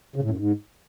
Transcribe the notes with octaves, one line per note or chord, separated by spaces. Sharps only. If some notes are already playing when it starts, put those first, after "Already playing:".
C#3
A2
F#2
G#2